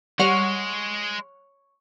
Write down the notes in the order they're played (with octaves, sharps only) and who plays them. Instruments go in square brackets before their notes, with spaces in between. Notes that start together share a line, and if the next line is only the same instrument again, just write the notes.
[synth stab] G3 F#5 F6 [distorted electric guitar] G#3 [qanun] C#5